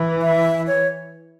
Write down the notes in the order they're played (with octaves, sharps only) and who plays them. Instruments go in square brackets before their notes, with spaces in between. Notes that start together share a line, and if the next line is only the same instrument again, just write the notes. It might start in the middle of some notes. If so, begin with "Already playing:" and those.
Already playing: [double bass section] E3
[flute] E5
C#5